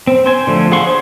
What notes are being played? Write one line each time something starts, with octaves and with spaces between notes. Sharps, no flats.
C4
C5 G#5
D3 F3 A3
G#4 F5 F#5 C6 C#6
C5 C#5